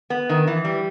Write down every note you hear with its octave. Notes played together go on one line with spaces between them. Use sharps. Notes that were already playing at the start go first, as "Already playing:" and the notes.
B3
D#3
E3
G3